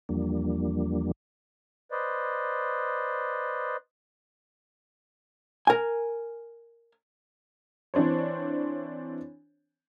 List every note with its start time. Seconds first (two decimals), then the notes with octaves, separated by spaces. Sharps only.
0.09 E2 F3 G3 A#3 D4
1.91 B4 C5 D5 D#5
5.67 A#4 G#5
7.94 E3 C4 D4 C5 C#5